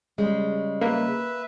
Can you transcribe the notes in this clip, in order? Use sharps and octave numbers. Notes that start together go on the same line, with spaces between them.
C#3 G3 G#3
A#3 B4 E5